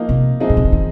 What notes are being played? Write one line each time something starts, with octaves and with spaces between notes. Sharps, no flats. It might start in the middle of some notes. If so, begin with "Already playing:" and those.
Already playing: F3 A#3 D#4
C3
F3 G#3 C4 D#4
A#2
C3
D3
D#3